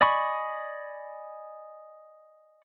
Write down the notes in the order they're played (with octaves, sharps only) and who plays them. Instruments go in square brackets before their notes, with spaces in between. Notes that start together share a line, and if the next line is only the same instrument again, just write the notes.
[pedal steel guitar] D5 D#5 G#5 B5 C#6